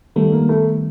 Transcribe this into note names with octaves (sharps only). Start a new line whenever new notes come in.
D#3 G3 A3 B3
A#3
A3